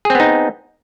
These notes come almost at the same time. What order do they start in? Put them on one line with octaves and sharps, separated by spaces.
G#4 C4 B3 D#4